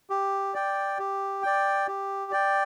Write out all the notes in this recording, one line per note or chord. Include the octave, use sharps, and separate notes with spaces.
G4
D5 G5
G4
D5 G5
G4
D5 G5